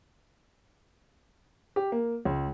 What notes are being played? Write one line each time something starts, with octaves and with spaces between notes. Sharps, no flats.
G4
A#3
C#2